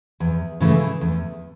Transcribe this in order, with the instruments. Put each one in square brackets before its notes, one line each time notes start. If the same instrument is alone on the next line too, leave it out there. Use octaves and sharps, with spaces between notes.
[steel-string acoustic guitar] E2
C#3 E3 A3
E2